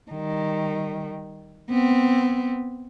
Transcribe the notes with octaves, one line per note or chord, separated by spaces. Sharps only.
D#3 G3
B3 C4